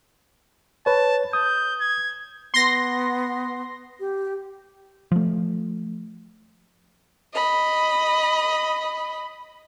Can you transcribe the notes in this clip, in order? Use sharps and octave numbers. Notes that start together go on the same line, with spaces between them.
B4 C#5 A5
D#6 G6
G#6
B3 C6 A#6
G4
F3 A3
D#5 B5